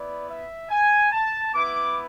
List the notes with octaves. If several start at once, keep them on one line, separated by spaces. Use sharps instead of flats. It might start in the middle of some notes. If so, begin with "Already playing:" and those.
Already playing: B3 E4 D5
E5
G#5
A5
B3 E4 D6